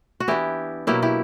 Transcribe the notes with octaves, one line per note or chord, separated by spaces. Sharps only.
F#4
E3 B3 D4 E4 G4
B2 F#3 A#3 E4 G4
E4 G4